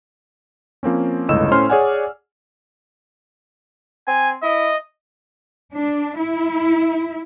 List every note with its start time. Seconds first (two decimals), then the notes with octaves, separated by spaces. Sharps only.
0.83 F3 A#3 C4 C#4
1.29 G1 C#2 A2 D#5 E6 E7
1.51 A2 C#4 C5 C6 F6
1.70 G#4 C#5 D5 F#5 G#5
4.07 C4 G#5
4.43 E4 D#5
5.73 D4
6.18 E4